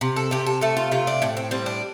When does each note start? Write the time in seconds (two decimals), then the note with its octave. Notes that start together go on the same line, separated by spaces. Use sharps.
0.01 C3
0.16 A4
0.31 C3 G4
0.46 A4
0.61 A3 A4
0.77 F4
0.92 C3 F4
1.07 D4
1.22 A2 C4
1.37 C4
1.51 G3 C4
1.66 D4